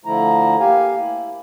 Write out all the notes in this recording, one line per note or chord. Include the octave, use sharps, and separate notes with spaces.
D3 F3 A3 E4 A#5
A#3 G4 F5 G#5
E4